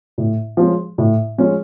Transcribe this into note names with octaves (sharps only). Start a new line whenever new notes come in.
A2
F3 G#3 C#4
A2
F3 G#3 C#4